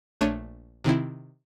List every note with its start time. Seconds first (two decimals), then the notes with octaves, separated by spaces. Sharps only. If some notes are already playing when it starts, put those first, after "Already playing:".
0.21 A#1 A3 D4 C#5 D#7
0.84 C3 D#3 C4 E4